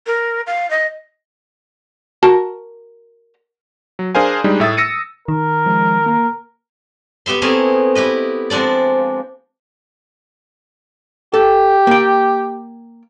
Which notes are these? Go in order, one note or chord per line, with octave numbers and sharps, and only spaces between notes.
A#4
F5
D#5
F#4 A#4 A5
F#3
D4 G#4 A#4 C5 F5 G#5
G3 G#3 D4 D#4 G#4
A2 E5 D#6 A6
E6 A#6 C#7 D#7
D#3 A#4
F3 G#3
A#3 A#5
B3 G4 E5 C6
A3 B3 C4 E4 G#4 A#4
E4 G4 B4 D#5
F3 G#3 C4 D4 D5
G4 A4
A#3 G5